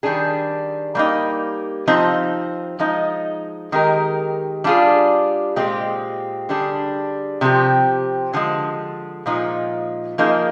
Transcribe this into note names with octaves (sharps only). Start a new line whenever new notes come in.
D#3 G3 D4 G#4
G3 A#3 D#4
F3 C4 D#4
F3 G#3 D#4
D#3 G#3 D#4 G4 A#4
G3 D4 F4 G#4
A#2 G#3 C4 G4
D3 G3 D4 G#4
C3 F3 C4 G4
D3 F3 G#3
A#2 F3 G#3 D#4
F3 A#3 D#4 G#4